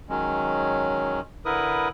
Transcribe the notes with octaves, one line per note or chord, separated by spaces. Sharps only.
D#3 F#3 G#3 C#4
D3 E4 A#4 B4 D#6